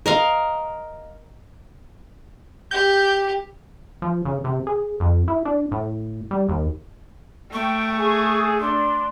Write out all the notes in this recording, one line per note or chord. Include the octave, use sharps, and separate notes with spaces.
A#4 D#5 F5
G4 G6
F3
C#3
C3
G#4
F2
E4
D4
A2
G3
D#2
A3 G5 C#6
G#4
D4 C6